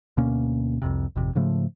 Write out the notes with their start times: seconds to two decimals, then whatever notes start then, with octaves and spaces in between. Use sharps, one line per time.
0.17 D2 B2 A#3 C#4
0.82 C2 F2 C3
1.16 G#1 F2 C3
1.35 G#2 C#3 F3 A3